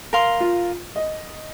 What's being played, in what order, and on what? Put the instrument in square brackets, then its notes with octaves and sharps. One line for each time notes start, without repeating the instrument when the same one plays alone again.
[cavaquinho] A#4 F5 C6
[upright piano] F4
D#5